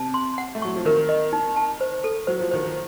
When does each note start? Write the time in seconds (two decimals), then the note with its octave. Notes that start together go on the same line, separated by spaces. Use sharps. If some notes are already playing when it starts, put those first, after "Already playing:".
Already playing: C3 A5
0.14 C6
0.38 F#5
0.55 A3
0.62 F#3 C#6
0.76 F3
0.85 D#3 A#4
1.09 D#5
1.33 D#4
1.56 A5
1.81 C5
2.04 A4
2.27 F#3 C5
2.40 F3
2.51 D#3 C5
2.66 F3